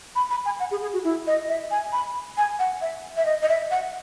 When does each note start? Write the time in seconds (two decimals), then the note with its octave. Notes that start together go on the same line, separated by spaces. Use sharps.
0.16 B5
0.31 B5
0.45 G#5
0.60 F#5
0.71 G#4
0.82 G#4
0.93 F#4
1.04 E4
1.27 D#5
1.48 E5
1.71 G#5
1.93 B5
2.37 G#5
2.59 F#5
2.81 E5
3.17 E5
3.26 D#5
3.42 D#5
3.48 E5
3.71 F#5